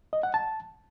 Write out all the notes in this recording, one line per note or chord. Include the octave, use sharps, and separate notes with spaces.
D#5
F#5
A5